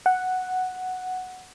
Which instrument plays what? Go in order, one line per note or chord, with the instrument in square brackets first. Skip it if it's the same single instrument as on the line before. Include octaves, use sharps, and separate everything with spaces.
[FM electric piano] F#5